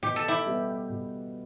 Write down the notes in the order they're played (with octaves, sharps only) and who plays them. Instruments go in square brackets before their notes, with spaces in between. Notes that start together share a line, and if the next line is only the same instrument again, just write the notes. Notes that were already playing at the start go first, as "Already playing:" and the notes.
[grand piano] B2 [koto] G4
[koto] A4
E4 G4
[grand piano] G3 B3
B2